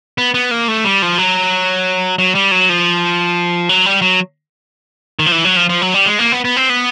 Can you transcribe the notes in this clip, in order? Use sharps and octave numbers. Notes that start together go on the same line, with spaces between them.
B3
B3
A#3
A3
G3
F3
F#3
F#3
G3
F#3
F3
F#3
G3
F#3
D#3
F3
E3
F#3
F3
F3
F#3
G3
G#3
A#3
B3
B3
C4
B3